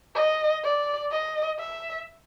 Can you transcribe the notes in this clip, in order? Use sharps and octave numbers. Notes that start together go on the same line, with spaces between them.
D#5
D5
D#5
E5